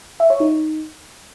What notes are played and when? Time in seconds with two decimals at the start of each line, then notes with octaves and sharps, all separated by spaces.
0.20 E5
0.30 C#5
0.40 D#4